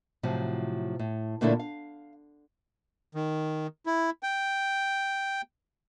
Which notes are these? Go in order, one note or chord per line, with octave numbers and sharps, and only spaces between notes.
A2 C3 F3 F#3
A2
A#2 D3 A3 A#3 C#4 E4
F5
D#3
E4
G5